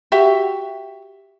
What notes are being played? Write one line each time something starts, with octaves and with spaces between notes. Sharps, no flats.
F#4 G4 E5